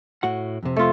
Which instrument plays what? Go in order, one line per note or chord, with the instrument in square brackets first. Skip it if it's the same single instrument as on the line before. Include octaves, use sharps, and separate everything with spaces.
[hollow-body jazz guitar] A2 F#4 F#5
F2 C3
[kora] A3 F4